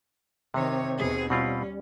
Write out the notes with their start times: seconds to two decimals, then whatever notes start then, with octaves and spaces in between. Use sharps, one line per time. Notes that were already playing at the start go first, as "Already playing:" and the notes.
0.54 C3 D#3 C4 C#5
0.98 D#2 B2 G#4
1.30 B2 G3 C4 C#4 F4